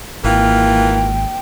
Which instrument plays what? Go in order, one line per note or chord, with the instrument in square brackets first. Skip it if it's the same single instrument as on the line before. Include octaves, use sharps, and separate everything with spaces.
[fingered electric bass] G#1 [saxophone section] E3 F4 A#4 [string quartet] A#3 [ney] G5